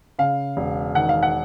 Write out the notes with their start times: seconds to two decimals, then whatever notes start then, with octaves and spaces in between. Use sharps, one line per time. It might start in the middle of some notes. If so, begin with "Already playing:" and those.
0.19 C#3 F5
0.57 E1
0.95 D#3 F#5
1.09 F5
1.23 F#5